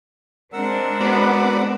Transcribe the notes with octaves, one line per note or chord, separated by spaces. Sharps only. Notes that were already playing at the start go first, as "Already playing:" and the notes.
G#3 C4 D4 A#4 F#5 E6
B3 F#4 B4 D5